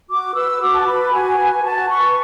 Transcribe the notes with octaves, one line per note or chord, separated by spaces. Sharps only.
F#4 D6
B4 E6
F#4 D6
A5
B4 B5
F#4 G#5
B4
F#4 A5
B4 C#6